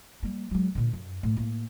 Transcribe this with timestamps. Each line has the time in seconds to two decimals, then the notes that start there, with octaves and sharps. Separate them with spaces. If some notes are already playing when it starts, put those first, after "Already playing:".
0.23 G3 A#3
0.51 F#3 G#3
0.75 A#2 D3
0.93 F#2
1.23 A2
1.37 A2 A#3